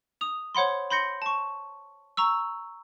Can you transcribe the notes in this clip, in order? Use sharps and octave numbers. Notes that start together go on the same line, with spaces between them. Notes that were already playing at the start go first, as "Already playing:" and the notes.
D#6 F7
C5 C#5 F#5 B5 C6
B5 C6 G6 A#6 C#7
A5 C#6
A#5 C#6 E6